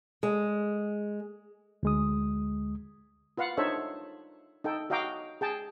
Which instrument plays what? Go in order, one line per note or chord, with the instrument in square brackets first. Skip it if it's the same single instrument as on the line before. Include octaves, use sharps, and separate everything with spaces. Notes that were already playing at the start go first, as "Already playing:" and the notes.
[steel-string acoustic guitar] G#3
[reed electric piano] D2 G#3 D#6
[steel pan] F4 B4 F5 F#5
D4 D#4 A4 C5 C#5 E5
D#4 A4 G5
F#4 D#5 F5 G5 A#5 D6
G#4 G5 A5